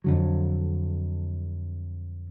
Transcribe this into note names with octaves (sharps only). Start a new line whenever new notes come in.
F2 D3 F#3